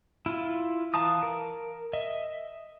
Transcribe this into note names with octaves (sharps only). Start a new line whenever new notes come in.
E4 F4
E3 F5 A5 A#5 D#6
A#4
D#5 E5